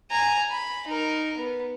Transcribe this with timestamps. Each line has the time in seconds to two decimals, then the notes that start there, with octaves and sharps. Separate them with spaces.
0.11 G#5 A#5
0.51 B5
0.87 D#4 A#4
1.37 B3